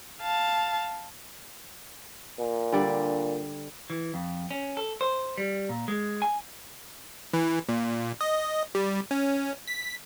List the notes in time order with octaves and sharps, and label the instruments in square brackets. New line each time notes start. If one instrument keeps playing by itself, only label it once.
[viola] F5 A5
[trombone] A#2
[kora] D3 G3 D5
[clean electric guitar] E3
F2
C#4
A4
C5
G3
A#2
G#3
G#5
[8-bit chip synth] E3
A#2
D#5
G3
C#4
B6